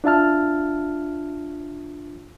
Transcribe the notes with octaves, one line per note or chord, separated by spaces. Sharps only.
D4 F4 E5 A5 F6